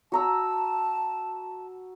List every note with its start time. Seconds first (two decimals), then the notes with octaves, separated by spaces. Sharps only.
0.12 F#4 A5 A#5 E6